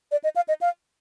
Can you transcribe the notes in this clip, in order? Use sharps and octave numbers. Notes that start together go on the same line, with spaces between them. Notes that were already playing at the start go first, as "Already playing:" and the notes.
D5
D#5
F5
D#5
F5